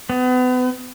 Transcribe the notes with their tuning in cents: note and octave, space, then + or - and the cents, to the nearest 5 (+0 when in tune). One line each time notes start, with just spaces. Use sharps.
B3 +35